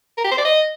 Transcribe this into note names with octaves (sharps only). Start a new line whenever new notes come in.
A#4
G4
C5
D5
D#5